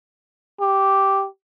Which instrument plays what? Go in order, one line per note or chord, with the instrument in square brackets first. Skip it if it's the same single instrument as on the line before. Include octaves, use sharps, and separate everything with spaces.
[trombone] G4